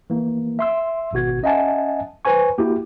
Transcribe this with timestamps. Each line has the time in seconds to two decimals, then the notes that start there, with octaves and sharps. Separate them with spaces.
0.10 E3 A#3
0.59 E5 C6 E6
1.13 G#1 B2 F#4 G#6
1.43 C#4 D#5 E5 F#5 G#5 A5
2.25 B4 C5 G#5 C#6
2.58 A#3 E4 F#4 G4